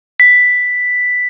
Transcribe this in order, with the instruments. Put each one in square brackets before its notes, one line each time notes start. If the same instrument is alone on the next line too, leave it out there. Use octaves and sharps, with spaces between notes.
[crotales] B6